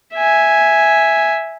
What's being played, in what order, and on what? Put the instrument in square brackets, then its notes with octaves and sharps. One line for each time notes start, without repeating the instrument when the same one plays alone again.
[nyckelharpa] E5 G#5